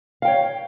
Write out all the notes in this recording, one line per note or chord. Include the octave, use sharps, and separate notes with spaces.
C#5 F5 G5